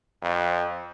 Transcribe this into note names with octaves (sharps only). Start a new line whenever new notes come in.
F2